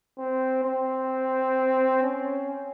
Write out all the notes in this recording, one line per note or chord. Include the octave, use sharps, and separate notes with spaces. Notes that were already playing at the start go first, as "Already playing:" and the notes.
C4
C4
C#4